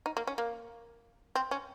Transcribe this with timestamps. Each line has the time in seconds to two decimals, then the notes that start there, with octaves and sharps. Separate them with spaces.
0.06 D#4
0.17 A#3
0.27 C#4
0.38 A#3
1.35 C4
1.51 C#4